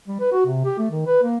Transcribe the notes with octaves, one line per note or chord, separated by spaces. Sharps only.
G3
B4
F#4
C3
G4
A3
D#3
B4
A#3